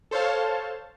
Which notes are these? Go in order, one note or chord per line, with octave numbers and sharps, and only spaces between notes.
A4 C5 C#5 F5 A5